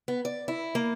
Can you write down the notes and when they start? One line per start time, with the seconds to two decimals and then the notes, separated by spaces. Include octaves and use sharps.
0.08 B3
0.25 D5
0.48 E4
0.75 A#3